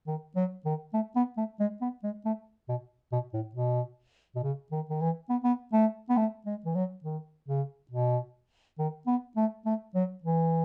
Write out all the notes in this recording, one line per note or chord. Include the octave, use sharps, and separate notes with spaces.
D#3
F#3
D#3
A3
B3
A3
G#3
B3
G#3
A3
B2
B2
A2
B2
B2
C#3
D#3
D#3
E3
B3
B3
A3
B3
A3
G#3
E3
F#3
D#3
C#3
B2
D#3
B3
A3
A3
F#3
E3